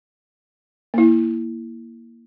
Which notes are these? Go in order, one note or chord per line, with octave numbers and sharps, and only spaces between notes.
A#3 E4